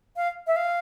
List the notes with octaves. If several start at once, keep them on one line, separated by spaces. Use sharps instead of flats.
F5
E5
F5